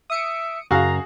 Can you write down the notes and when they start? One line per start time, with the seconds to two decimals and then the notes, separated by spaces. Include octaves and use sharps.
0.10 E5 D#6 C#7 D7
0.71 F#2 C#3 F#4 G#4 F5 A#5